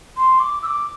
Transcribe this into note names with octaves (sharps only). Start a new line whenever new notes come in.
C6
D6
E6
D6